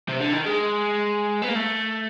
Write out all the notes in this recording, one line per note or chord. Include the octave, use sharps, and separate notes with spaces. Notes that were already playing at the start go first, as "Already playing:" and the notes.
C3
D3
D#3
G#3
B3
A#3
A3